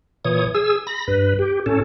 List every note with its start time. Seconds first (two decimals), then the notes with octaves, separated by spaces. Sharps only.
0.25 A#2 E3 C#5 D#6
0.55 G#4 E6
0.87 B5 A#6
1.08 G2 B4
1.39 G4
1.66 A2 C#4 A4